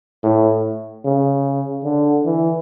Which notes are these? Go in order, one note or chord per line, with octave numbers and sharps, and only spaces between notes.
A2
C#3
D3
E3